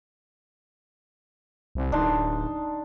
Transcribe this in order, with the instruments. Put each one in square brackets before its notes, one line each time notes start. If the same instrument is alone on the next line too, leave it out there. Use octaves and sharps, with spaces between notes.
[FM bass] C2
[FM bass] D1 [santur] D4 D#4 C6